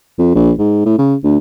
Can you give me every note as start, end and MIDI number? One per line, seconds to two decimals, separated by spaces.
0.19 0.33 41
0.35 0.52 34
0.59 0.85 44
0.86 0.98 45
0.99 1.15 49
1.24 1.38 38